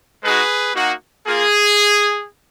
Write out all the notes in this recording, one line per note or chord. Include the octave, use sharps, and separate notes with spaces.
G#3 D#4 F#4 G#4 B4
A#3 D#4 F#4
A#3 F4 G#4